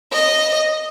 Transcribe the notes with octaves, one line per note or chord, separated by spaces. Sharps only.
D#5